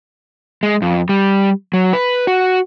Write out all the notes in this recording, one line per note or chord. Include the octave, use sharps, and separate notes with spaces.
G#3
F2
G3
F#3
B4
F#4